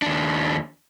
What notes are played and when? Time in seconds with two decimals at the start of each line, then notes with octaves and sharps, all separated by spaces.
0.02 D#2 D4